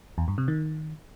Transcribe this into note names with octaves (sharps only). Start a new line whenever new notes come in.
E2
G2
C3
D#3